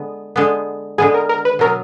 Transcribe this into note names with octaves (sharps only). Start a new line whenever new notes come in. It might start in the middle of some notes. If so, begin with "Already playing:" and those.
Already playing: D3 G#3 B3
D3 G#3 B3
D3 G#3 B3 G#4
A#4
A#4
B4
B2 F#3 B3 A#4